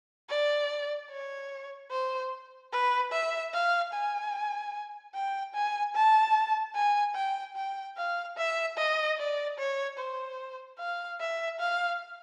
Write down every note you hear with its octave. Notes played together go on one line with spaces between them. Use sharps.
D5
C#5
C5
B4
E5
F5
G#5
G5
G#5
A5
G#5
G5
G5
F5
E5
D#5
D5
C#5
C5
F5
E5
F5